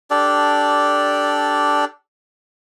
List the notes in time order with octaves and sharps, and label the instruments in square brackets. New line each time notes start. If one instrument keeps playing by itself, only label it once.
[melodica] D4 G4 A4 D5